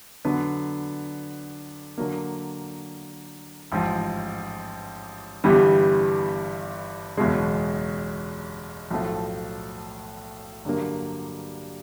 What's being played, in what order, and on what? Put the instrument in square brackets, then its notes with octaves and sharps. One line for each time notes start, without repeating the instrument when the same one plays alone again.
[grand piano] D3 F#3 B3
D3 F#3 A#3
A1 G#2 F3
G1 G2 E3 G3 B3
F#1 E2 B2 G#3
B1 A2 F3 A3
G2 D3 F#3 A#3